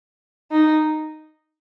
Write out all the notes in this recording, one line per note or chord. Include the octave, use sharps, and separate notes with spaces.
D#4